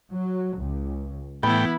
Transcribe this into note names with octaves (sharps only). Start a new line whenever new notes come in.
F#3
C#2
A2 E3 B3 E4 G5 B5